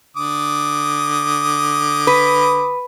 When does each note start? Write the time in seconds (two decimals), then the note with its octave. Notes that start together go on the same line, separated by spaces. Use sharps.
0.17 D3 D6 D#6
2.07 B4